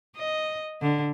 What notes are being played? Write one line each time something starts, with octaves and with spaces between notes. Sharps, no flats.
D#5
D3